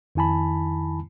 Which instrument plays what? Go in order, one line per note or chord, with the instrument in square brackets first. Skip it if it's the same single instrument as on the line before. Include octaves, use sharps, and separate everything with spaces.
[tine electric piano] F2 D#3 E4 G#5 A5 B5